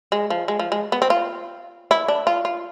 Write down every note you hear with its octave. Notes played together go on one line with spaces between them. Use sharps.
G#3
F3
G#3
F3
G#3
B3
C4
F4
E4
D4
F4
F4